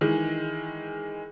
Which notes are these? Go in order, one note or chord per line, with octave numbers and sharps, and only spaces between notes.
D#3 E3 G#3